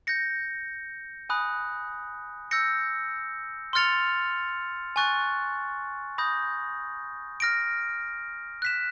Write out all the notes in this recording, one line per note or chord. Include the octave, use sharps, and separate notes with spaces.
G6 A#6 C#7
G#5 B5 D#6 F#6
E6 G6 A#6 C#7
C6 F6 A6 C#7 F7
G#5 C#6 F#6 A6
B5 D#6 G6 A#6
F6 A#6 D7
F#6 B6 E7